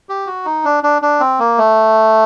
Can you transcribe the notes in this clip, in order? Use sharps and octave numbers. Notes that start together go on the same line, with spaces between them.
G4
F#4
D#4
D4
D4
D4
C4
A#3
A3